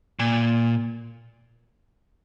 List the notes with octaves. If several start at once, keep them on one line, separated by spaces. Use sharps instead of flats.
A#2